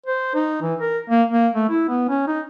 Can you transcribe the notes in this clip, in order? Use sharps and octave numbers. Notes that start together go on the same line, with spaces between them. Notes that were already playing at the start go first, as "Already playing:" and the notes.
C5
D#4
E3
A#4
A#3
A#3
A3
E4
B3
C#4
D#4